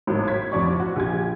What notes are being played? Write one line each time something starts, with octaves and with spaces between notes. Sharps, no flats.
G#1 A2 F#3
G#6 B6
A1 F2 D5 C#6
F#4
A#1 G4 G#6